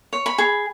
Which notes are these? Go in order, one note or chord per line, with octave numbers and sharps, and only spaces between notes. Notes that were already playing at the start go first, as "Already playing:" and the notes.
C#5
B5
G#4